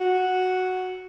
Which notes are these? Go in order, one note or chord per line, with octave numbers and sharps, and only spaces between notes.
F#4